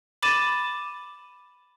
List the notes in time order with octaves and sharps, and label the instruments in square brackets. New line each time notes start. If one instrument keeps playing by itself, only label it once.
[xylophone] B5 D6 A6 D#7 E7